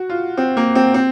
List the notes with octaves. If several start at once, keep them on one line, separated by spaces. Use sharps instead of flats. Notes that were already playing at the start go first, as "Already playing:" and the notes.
Already playing: F#4
F4
C4
A#3
C4
C4